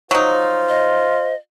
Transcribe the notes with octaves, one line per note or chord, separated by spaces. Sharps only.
F#3 D#4 F4 C5
D#5